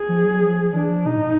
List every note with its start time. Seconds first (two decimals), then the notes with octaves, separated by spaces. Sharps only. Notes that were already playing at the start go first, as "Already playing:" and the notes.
Already playing: G#4
0.09 F3
0.25 F#3
0.41 F3
0.73 E3 D4
0.89 F3
1.05 B2 D#4
1.16 A2